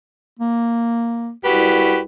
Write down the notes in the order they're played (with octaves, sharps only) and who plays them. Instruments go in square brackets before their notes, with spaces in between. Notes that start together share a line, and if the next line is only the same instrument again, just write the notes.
[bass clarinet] A#3
[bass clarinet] C2 [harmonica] F#4 G4 B4